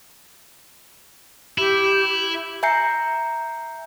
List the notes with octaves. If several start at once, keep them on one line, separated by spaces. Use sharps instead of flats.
E4 G4
E5 G#5 A#5 G6 C7 C#7